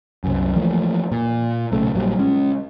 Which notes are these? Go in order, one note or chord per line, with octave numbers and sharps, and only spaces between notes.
C2 F#2
E3 F3 A3 A#3
A#2
B1 C#3 A3
A#1 A#2 F#3 G3
G#3 C#4